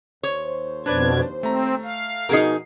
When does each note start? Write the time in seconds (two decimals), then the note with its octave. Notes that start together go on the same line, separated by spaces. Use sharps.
0.23 D#2 C5 C#5
0.86 F2 B2 D4 B4 D5 G#6
1.43 A3 C4 A#5
1.84 F5
2.29 B2 F3 D#4 F#4 G#4 A#4 C7